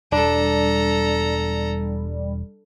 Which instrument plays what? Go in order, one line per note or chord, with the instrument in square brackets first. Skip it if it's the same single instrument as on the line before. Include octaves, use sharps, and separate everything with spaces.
[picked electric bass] E1 [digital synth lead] G3 [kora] D4 [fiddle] A4 A#5